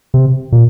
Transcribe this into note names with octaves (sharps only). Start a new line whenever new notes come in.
C3
A#2